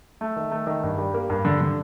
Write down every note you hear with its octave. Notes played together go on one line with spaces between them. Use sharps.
A3
D#3
A3
D#3
G2
G3
A#3
G2
D3
D3